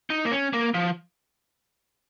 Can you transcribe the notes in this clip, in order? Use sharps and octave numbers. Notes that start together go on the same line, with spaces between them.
D#4
A#3
C#4
A#3
F3